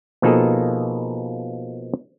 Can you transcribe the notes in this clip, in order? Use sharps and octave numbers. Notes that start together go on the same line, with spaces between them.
B2 F3 A#3 D#4 G#4 A4